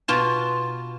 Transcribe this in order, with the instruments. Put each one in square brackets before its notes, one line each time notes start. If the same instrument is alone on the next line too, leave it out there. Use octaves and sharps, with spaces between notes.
[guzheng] B2 F4 A5